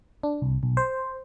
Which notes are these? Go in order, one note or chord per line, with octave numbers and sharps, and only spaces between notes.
D4
C2
B1
C5